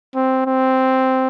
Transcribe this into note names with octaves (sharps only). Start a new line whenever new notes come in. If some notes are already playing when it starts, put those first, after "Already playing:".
C4
C4